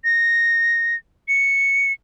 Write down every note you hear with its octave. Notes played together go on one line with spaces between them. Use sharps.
A#6
C#7